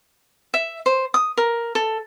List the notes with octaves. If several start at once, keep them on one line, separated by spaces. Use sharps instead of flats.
E5
C5
D#6
A#4
A4